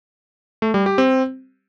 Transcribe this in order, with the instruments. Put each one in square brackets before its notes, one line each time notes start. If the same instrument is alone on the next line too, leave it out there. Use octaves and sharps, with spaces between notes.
[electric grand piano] A3
G3
G4
C4